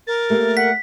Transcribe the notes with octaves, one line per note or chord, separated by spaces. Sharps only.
A#4 A6
A3 A#3 G4
F#5 B6